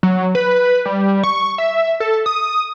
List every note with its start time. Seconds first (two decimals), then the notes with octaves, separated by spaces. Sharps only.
0.03 F#3
0.35 B4
0.86 G3
1.24 C#6
1.58 E5
2.00 A4
2.26 D#6